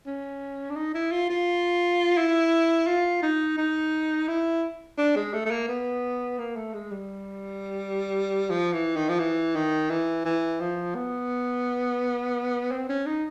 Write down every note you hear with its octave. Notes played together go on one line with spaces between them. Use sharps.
C#4
D4
D#4
E4
F4
F4
E4
F4
D#4
D#4
E4
D4
G#3
A3
A3
A#3
B3
A#3
A3
G#3
G3
F3
E3
D#3
F3
E3
D#3
E3
E3
F3
B3
C4
C#4
D#4